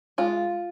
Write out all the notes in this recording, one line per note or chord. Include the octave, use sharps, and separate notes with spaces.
G#3 F4